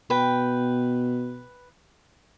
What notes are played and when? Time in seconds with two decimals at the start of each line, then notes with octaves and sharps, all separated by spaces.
0.10 B2 B4 G5